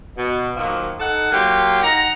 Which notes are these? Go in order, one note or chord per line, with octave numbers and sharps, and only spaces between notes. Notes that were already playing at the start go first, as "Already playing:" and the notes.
B2
D#3 F3 F#3 A#3
D#4 A4 F#5
F#3 A#3 F4 G4
D#4 F#5 A#5